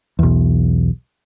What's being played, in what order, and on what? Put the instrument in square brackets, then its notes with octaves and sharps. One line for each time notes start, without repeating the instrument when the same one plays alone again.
[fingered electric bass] B1 E2